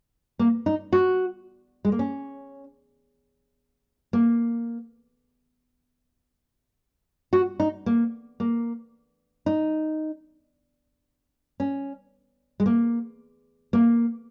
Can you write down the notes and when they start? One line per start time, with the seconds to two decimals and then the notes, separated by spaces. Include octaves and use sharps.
0.39 A#3
0.66 D#4
0.93 F#4
1.85 G#3
1.92 A#3
1.99 C#4
4.13 A#3
7.33 F#4
7.60 D#4
7.86 A#3
8.40 A#3
9.46 D#4
11.60 C#4
12.60 G#3
12.66 A#3
13.73 A#3